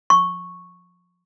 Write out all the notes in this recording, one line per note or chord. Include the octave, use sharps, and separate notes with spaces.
C#6